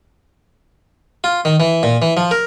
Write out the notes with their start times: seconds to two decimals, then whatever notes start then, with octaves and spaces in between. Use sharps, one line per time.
1.24 F4
1.45 D#3
1.60 E3
1.83 A#2
2.02 E3
2.17 F3
2.31 A#4